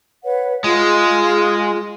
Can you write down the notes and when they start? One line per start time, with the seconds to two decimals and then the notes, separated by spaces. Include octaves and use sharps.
0.24 B4 C#5 F#5
0.64 G#3 F4 G#4 C6